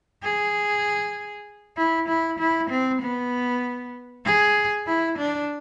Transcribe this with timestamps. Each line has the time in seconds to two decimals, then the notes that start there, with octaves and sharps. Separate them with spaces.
0.23 G#4
1.77 E4
2.08 E4
2.39 E4
2.70 C4
3.01 B3
4.25 G#4
4.87 E4
5.18 D4